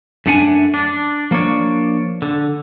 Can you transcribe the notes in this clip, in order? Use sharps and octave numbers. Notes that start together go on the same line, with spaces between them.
F#2 A3 D4 F#5 G#5
D4
F3 A#3 D4 C#5 D5
D3